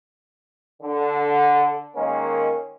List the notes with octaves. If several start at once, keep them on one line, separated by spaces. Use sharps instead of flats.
D3
D#3 G#3 A#3 C#4